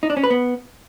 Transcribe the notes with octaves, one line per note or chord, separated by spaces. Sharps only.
D#4
D4
C#4
B4
B3